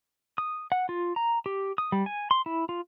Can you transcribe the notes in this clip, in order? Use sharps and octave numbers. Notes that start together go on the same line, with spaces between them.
D#6
F#5
F4
A#5
G4
D#6
G3
G#5
C6
E4
F4